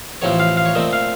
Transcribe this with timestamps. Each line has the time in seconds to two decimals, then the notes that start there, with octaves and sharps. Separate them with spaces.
0.22 A1 A2 F3 C4 C#5
0.40 F5
0.57 F5
0.66 C#5
0.75 A#2 A3 C4 D#5
0.93 F5